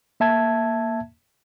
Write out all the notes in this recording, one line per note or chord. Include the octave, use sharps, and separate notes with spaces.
A#3 E5 A5 G#6